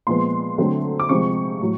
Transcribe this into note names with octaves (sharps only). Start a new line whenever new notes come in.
A#2 F3 G#3 B3 C6
D3 F#3 A3 C4
D6
C3 F3 G#3 C4 C#6
A2 F#3